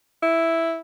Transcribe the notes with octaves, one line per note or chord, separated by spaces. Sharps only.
E4